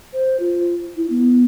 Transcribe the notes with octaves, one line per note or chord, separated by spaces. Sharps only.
C5
F4
E4
B3